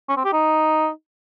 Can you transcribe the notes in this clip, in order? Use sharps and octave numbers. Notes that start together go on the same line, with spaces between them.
C#4
C4
G4
D#4